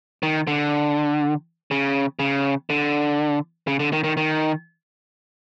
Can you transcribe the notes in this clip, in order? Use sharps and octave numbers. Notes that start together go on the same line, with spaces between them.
D#3
D3
C#3
C#3
D3
C#3
D3
D#3
D#3
D#3